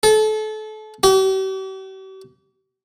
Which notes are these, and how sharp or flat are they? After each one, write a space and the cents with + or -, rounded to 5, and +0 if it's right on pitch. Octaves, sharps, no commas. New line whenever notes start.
A4 -30
G4 -45